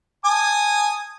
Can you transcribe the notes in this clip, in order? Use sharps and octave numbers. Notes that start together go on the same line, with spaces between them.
G#5 A5 D#6